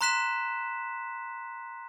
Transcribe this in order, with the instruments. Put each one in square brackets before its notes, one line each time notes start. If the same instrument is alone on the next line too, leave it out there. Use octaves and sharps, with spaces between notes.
[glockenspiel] A#5 C6 F#6 B6 E7